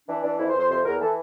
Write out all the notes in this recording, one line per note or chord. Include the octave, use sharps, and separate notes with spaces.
E3 D4
E3 D4
F2 E4
C5
F2
C5
C3 C5
E2 A#4
E3 A4